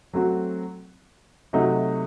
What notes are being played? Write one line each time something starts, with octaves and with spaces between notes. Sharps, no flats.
F#3 A3 C4 F#4
C3 F#3 A3 D#4 F#4